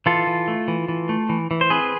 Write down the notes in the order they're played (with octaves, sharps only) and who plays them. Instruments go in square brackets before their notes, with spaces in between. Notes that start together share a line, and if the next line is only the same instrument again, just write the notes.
[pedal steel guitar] E3 F4 A4
E3
A3
E3
E3
A3
E3
E3
C5
C4 G#4 B4